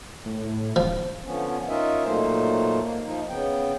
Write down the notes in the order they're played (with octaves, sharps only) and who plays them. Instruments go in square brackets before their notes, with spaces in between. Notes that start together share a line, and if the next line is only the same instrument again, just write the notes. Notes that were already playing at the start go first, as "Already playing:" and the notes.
[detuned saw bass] A2
[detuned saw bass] D1 [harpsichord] F3
[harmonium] D3 F3 B3 C#4
C#4 D#4 F4 A#4 D#5 E5
A#2 F#3 A3 A#3 D#4 C5
A#3
F3 D#4
C#3 B3 G5